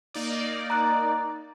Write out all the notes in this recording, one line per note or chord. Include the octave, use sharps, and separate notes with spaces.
A#3 D#4 D5
A#5 F#6